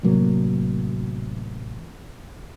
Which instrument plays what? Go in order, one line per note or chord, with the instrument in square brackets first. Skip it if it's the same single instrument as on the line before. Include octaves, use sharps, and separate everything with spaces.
[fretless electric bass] A1 C3 F#3 A#3